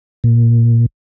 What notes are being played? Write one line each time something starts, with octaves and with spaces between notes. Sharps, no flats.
A#2